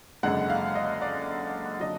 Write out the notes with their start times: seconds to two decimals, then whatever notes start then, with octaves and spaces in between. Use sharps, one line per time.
0.23 F#1 F#2 D3 G#3 F#5
0.50 F5
0.75 D#5
1.02 D5
1.80 D3 F#3 D#5